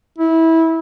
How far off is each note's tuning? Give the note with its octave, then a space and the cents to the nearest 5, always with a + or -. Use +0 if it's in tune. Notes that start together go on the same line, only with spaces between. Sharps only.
E4 -20